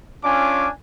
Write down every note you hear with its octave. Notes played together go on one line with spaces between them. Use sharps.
C#4 D4 F4 G#5 D6